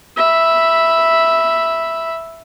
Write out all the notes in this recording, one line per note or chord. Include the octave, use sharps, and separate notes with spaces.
E5 B5